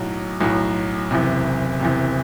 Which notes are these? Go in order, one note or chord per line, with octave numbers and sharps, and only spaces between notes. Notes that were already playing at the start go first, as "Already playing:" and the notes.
Already playing: B1 A2 F#3
B1 A2 F#3
F#1 E2 C3
F#1 E2 C3